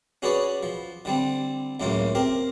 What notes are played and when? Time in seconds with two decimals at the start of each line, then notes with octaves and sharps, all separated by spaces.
0.22 C#4 F#4 G#4 B4 C#5 D5
0.63 F3
1.05 D3 G3 C4
1.80 C#2 F#2 A2 C#3 A#3 F4
2.15 C4 G4 A#4